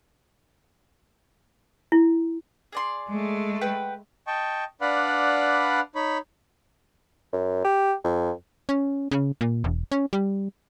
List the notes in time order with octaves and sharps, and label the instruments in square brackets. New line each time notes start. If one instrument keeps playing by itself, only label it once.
[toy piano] E4
[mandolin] G#4 D5 C6
[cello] G#3 A3
[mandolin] B4 F#5 G5
[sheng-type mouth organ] D#5 G5 A5 C#6
D4 B4 D5 F5 F#5 B5
D#4 C#5 B5
[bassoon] F#2
G4
F2
[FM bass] C#4
C#3
A#2
E1
C#4
G3